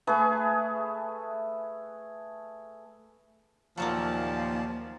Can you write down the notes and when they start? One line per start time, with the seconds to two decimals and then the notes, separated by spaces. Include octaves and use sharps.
0.07 A3 G#4 B4
3.77 D#2 A#2 F3 F#3 A3 A#3 A5